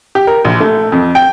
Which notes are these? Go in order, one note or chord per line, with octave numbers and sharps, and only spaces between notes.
G4
A#4
A#1
A3
F2
G5